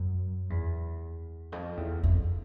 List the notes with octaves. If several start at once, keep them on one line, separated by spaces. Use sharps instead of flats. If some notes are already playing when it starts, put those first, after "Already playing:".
Already playing: F#2
E2
F2
E2
F2